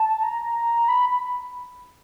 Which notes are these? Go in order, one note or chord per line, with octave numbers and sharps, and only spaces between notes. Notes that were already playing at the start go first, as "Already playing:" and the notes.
Already playing: A5
A#5
B5
B5